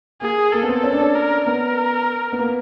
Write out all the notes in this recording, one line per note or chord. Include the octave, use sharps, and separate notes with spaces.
A#3 G#4
A#3 A4
B3
C4
C#4
D4
C#4
A#4
B3 A#4
B3
A#3